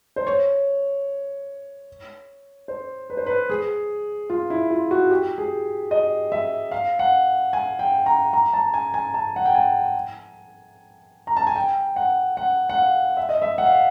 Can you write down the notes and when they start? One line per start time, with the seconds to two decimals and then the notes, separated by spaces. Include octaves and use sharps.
0.16 C5
0.27 C#5
2.68 C5
3.10 B4
3.17 C5
3.26 B4
3.50 G#4
4.30 F4
4.50 E4
4.71 F4
4.91 F#4
5.11 G4
5.38 G#4
5.91 D#5
6.32 E5
6.72 F5
6.99 F#5
7.53 G#5
7.79 G5
8.06 A#5
8.33 A#5
8.53 A5
8.74 G#5
8.94 G#5
9.14 A5
9.36 F#5
9.45 G5
9.55 G#5
11.27 A#5
11.37 A5
11.47 G#5
11.56 G5
11.96 F#5
12.37 F#5
12.69 F#5
12.78 F5
13.17 E5
13.29 D#5
13.42 E5
13.58 F#5
13.66 F5